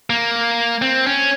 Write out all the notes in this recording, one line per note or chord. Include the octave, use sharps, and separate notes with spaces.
A#3
C4
C#4